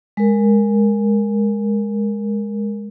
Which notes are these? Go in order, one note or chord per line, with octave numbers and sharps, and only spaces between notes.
G#3 A#4